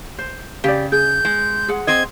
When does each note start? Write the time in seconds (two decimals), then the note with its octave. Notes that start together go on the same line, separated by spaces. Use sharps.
0.18 C5
0.64 C#3 G4 D5
0.92 G#4 G6
1.25 G#3
1.68 G#4 F#5
1.87 C4 C5 D#5 G#6